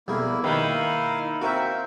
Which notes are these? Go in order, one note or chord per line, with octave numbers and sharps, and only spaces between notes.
B1 F2 G3 A#3 E4 G#4
D#3 G#3 A#3 D#4 E4 B4 F5
C4 F#4 A#4 E5 F5 G5